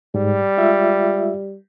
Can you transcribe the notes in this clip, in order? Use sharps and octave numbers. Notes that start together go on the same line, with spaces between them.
G#2 G3
G#3 F4 E5